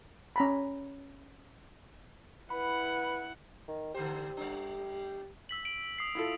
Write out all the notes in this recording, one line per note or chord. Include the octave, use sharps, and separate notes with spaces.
C#4 A#5 B5
E4 B4 F#5 B5
D#3
D3 A3 G4 C5
G3 D4
E6 B6 F#7
D7 F#7
D#6 C7
E4 F4 A4